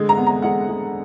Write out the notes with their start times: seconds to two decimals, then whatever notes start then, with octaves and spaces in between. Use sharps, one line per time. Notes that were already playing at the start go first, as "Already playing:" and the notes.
Already playing: D3 G#3
0.09 A#5
0.17 B3
0.27 A#5
0.42 G#3 F#5
0.68 G#3